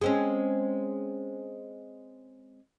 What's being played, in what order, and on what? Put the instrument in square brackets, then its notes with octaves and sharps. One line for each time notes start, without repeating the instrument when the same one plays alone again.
[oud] G#3 C4 C#4